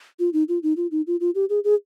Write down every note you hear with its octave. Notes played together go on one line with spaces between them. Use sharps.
F4
D#4
F4
D#4
F4
D#4
F4
F4
G4
G#4
G#4